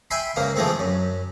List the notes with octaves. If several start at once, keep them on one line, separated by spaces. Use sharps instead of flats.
E5 G5 G#5 B5 C6
C#2 G#2 A#3 F5
G#2 E3 F3 G#3 A3 C4
F#2